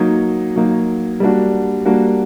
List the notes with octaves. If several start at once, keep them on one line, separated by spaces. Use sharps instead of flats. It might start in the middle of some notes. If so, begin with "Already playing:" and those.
Already playing: F#3 A#3 D#4
F#3 A#3 D#4
G3 A#3 D4 F#4
G3 A#3 D4 F#4